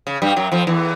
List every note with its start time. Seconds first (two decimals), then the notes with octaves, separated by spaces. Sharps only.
0.07 C#3
0.22 G2 G3
0.36 F#2 F#3
0.52 F2 F3
0.67 E2 E3